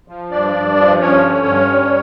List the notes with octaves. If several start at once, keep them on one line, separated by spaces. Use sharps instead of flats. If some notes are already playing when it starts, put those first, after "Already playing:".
F3
G2 D4 D5
G2
F3
G2 C#4 C#5
D3
G2
G3